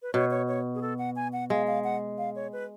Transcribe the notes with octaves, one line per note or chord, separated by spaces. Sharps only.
B4
B2 C#5
C#5
C#5
G#4
A4
F#5
G#5
F#5
G#3 F5
F5
F#5
F5
C#5
B4